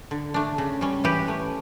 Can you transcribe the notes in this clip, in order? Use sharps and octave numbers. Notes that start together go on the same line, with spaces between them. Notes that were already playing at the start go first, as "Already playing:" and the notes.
D3
A3 D4
C#3
G3 C#4
E3 G4 B4
A3 C#4